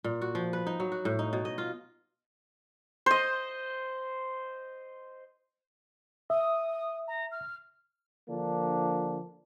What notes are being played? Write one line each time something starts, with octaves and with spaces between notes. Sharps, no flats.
A#2
F#4
F3
B4
D#4
F#3
F#4
A2
D#4
B2
D#5
F4
C5 D#5
E5 D#6
A#5
F6
D3 F3 A#3 D4